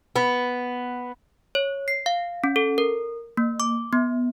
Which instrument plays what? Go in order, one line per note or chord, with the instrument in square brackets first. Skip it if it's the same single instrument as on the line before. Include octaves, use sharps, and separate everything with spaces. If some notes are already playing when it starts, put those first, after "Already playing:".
[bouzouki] B3
[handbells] C#5
C7
F5
C#4
A4
A#4
A#3
D6
B3